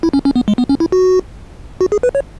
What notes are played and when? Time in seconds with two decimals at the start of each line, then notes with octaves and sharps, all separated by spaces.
0.03 E4
0.13 C#4
0.25 C#4
0.36 B3
0.48 G#3
0.58 B3
0.69 C#4
0.80 E4
0.92 F#4
1.81 F#4
1.92 G#4
2.03 B4
2.15 C#5